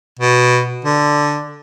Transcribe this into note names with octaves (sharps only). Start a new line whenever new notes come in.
B2
D3